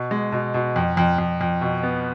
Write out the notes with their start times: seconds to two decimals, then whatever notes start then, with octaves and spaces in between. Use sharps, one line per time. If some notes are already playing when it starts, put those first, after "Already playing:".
Already playing: B2
0.11 G#3
0.32 B2
0.54 B2
0.76 F2
0.97 F2
1.18 F2
1.41 F2
1.61 B2
1.83 B3